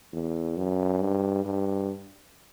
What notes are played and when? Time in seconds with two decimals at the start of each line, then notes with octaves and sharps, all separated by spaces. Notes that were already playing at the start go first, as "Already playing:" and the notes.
0.13 E2
0.57 F#2
1.01 G2
1.45 G2